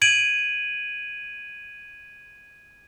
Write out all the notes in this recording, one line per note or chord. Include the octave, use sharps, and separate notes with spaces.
G#6 D7 D#7 F#7